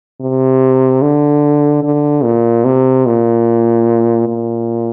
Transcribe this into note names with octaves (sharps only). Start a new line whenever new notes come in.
C3
D3
D3
A#2
C3
A#2
A#2